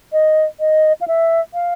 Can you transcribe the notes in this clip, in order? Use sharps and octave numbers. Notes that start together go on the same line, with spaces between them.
D#5
D#5
F5
E5
F5